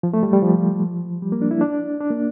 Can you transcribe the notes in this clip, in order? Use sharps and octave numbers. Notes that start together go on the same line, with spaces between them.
F3
A3
G3
G3
F3
G3
A#3
D4
E4
D4
D4
A#3